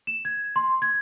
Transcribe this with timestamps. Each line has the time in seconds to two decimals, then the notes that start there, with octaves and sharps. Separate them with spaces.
0.07 E7
0.25 G#6
0.56 C6
0.82 G#6